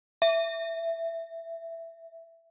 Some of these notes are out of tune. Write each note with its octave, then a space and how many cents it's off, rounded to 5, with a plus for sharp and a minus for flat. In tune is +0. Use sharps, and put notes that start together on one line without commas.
E5 +10